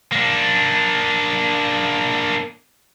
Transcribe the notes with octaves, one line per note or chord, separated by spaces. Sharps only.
A#3 D4